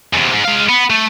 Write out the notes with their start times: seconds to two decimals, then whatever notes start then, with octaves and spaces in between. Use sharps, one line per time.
0.14 E2 C3
0.33 G#2
0.45 G#3 F5
0.69 B3
0.90 A3